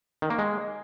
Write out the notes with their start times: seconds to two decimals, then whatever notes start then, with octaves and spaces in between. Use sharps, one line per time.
0.22 D#3
0.30 A#3
0.39 G#3